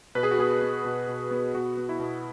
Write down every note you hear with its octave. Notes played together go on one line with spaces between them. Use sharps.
B2 B4
G#4
F#4
B3 G#4
B3
B2
B2
B3
B2 F#4
B3
E4
B2